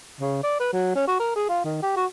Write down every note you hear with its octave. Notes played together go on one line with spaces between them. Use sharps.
C#3
D5
B4
F#3
C#4
F#4
A#4
G#4
F4
D#3
G4
F#4